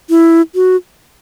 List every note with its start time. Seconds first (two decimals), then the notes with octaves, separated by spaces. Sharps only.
0.10 E4
0.55 F#4